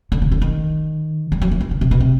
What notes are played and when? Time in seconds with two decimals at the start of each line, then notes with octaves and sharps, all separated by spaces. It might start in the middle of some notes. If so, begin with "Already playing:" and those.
0.12 D3
0.22 C#3
0.32 D3
0.41 D#3
1.32 G3
1.41 F#3
1.51 E3
1.60 D#3
1.71 C#3
1.81 C3
1.91 B2
2.00 C3